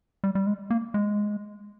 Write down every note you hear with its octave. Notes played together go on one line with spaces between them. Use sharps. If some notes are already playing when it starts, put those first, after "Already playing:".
G3
G3
G#3
A#3
G#3